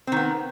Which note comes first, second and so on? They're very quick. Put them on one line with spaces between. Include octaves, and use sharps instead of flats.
C4 D#3 B3